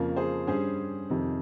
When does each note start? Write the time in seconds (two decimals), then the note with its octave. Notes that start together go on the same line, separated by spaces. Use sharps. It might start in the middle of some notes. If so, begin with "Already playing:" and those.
Already playing: F2 C#3 F3 A#3
0.16 G#4 C5
0.47 G2 G3 C#4 G#4 C5
1.10 F2 C3 D#3